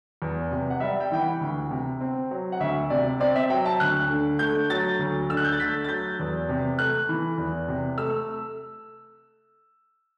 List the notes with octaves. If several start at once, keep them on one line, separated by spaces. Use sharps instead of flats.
E2
C3
F#5
G3 E5
G5
E3 G5
F#5
D2
C3
C4
F#3
F#5
D2 E5
C3 D5
C4 D5
E5
F#3 G5
A5
D2 F#6
D3
A3 G6
F#3 A6
D2
D3 E6
F#6
G6
A6
A3 B6
A6
F#3 G6
E2
C3
A3 F#6
E3
E2
C3
A3 E6